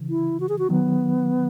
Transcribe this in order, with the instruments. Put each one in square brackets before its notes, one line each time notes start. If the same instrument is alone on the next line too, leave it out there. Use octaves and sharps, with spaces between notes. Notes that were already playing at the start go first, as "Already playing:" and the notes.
Already playing: [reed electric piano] C#3 E3
[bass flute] E4
F#4
G#4
F#4
[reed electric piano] D#3 F#3 [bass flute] B3